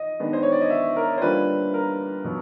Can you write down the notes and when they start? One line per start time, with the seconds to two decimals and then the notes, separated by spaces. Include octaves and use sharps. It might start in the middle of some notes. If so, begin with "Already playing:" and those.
Already playing: D#5
0.19 D#3 G#3 B3 D4
0.33 C5
0.43 C#5
0.52 D5
0.61 D#5
0.70 E5
0.97 A#4
1.18 C5
1.21 D3 G3 A#3 D4 F4 B4
1.74 A#4
2.25 B2 F#3